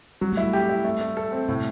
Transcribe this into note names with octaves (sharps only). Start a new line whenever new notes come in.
F#3 G3
A3 E4
G3
G4
E4
A3
A3
A4
C4
A2 C3